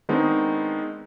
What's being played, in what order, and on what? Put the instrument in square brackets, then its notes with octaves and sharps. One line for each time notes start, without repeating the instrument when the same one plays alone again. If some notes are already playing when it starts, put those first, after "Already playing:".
[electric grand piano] D#3 G#3 B3 C4 D4 D#4